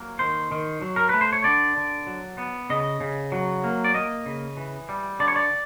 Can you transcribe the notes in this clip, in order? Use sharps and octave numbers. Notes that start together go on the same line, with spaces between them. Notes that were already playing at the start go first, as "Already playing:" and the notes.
Already playing: F#3 A#3
D#3 C5
D#3
F#3
A#4
A3 B4
C5
C#5
D3 D5
D3
F#3
B3
C#3 D#5
C#3
F#3
A#3
D5
A#3 D#5
C#3
E3
G3
D3 D5
C#5
D5